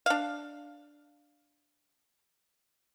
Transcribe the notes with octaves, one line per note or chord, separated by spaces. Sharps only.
D4 F5